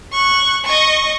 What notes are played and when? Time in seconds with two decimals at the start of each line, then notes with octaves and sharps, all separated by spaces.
0.12 C#6 F#6
0.65 D#5 C#6